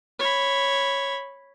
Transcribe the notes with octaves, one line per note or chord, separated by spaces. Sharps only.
C#5 B5